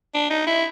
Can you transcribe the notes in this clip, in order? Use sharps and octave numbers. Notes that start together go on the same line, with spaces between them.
D4
D#4
E4